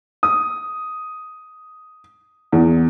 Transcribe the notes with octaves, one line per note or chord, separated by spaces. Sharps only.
D#6
E2